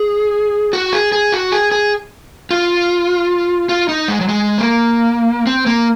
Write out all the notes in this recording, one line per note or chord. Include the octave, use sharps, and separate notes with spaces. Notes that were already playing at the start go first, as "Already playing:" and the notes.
Already playing: G#4
F#4
G#4
G#4
F#4
G#4
G#4
F4
F4
D#4
G#3
F#3
G#3
A#3
C4
A#3